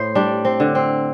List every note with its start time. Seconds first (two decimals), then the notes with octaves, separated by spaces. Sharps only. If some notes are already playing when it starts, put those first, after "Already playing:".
Already playing: A2 A3 C5
0.15 G3 D4
0.45 C4
0.60 D3
0.75 C4